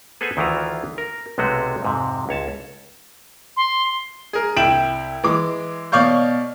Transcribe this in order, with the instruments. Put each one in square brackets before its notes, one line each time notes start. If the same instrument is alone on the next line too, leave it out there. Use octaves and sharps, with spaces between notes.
[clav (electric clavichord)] G#4 A4 B4 C5 F#5 G#5
D2 D#3 E3 E4 F4 A#5
A#4
B1 C3 G#3 A3 F#4
F2 G#2 C3
C#2 C#5 A5
[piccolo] C6
[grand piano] G#4 A#4
C2 E4 G5 D7 E7 F#7
E3 G#3 D6
B2 C#5 D5 F5 C#6 G6